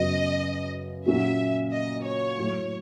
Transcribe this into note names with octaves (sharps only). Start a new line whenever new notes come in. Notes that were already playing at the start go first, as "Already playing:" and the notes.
Already playing: F#2 C#3 F#3 B3 D#5
A#2 F#3 A#3 C#4 F#4 E5
D#5
C#5
A2 F#3 A3